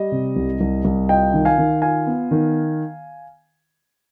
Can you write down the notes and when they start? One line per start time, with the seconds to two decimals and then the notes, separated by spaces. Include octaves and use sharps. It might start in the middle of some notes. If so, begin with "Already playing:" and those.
Already playing: G3 D#5
0.12 C3
0.36 C2
0.61 C2
0.85 C2
1.09 F4 D#5 G5
1.34 D#3
1.45 F5 G#5
1.58 D#3
1.82 F4 F5 G#5
2.07 B3
2.31 D#3